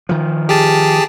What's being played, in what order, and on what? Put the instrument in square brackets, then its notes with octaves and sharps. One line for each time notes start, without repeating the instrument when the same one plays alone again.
[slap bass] D#3 F3
[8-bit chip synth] G4 G#4 A5